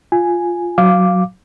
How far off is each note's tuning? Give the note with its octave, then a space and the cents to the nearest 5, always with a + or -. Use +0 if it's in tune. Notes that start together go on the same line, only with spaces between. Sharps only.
F4 +0 G#5 +0
F#3 +0 F5 +0 D6 +0